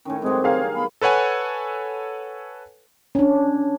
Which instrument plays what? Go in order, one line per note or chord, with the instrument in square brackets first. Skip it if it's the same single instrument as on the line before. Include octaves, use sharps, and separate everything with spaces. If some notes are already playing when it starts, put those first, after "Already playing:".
[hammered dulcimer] A2 D#3 [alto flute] C#4
[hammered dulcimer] G2 F#3 [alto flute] G#3 [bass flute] C4
[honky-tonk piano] G#4 A#4 F5 [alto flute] C#5
[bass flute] B3 [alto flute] B5
[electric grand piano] A4 B4 C#5 F#5 G#5
[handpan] C#4 D4